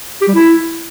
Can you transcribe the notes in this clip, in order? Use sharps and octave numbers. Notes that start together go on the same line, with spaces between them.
G4
G3
E4